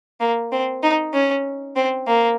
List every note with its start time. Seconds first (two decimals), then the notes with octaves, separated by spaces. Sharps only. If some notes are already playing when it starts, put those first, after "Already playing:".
0.20 A#3
0.52 C4
0.83 D#4
1.13 C#4
1.76 C4
2.07 A#3